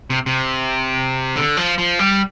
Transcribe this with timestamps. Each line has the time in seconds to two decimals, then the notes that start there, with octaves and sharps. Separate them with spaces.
0.10 C3
0.26 C3
1.36 D3
1.57 F3
1.78 F3
1.99 G3